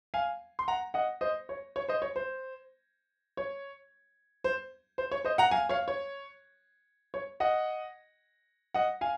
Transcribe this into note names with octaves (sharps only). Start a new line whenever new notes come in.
F5 G#5
C6
F#5 A#5
D#5 F#5
C5 D#5
C#5
C#5
C5 D#5
C#5
C5
C#5
C5
C5
C#5
C5 D#5
F#5 A#5
F5 G#5
C#5 F5
C#5
C#5
D#5 F#5
D#5 F#5
F5 G#5